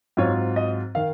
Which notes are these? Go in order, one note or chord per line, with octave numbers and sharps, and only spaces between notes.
G#2 F#3 C4 F4 C#5
D#5
D#3 F5